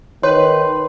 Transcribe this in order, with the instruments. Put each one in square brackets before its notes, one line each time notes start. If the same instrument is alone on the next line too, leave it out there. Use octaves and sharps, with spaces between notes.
[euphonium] D#3 [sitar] B4 [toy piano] C#5 [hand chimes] C6